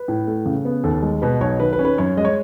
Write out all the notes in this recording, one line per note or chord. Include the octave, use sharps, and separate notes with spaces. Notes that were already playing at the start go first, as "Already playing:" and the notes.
Already playing: B4
A2
A3
C#3
B3
D#2 A4
G#3
B2 B4
B1 C#5
D#3 B4
B4
C#4
B4
F#2 C#5
G#3 D#5
C#5